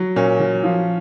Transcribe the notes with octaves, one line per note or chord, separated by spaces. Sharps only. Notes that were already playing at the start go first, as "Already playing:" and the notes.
Already playing: F#3
A#2 C#4
F#3
F3